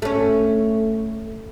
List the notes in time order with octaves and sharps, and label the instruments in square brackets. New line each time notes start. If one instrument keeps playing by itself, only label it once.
[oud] A3 C#4